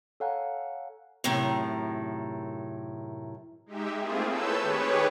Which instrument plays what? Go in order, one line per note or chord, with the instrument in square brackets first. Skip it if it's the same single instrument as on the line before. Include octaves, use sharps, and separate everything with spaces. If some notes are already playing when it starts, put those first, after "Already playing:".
[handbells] A4 C#5 F5 F#5 G#5 A#5
[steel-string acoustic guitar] F#2 A2 C3 D#3
[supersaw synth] G#3 D#4 G4 E5
A3 A#3 C4 E4 F4 G#4
A4 B4 C#5 A5 E6 G6
D#3 G4 G#4 B4 C#5